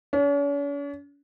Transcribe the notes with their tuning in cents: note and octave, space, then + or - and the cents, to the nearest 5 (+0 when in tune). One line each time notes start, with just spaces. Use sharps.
C#4 +45